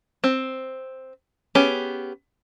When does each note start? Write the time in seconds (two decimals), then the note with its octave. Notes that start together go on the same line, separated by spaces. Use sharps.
0.24 C4
1.55 B3 C#4 G4 G#4